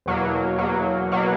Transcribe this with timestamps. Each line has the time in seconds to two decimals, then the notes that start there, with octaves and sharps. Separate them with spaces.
0.06 E2 B2 F#3 A#3
0.58 E2 B2 F#3 A#3
1.12 B2 F#3 A#3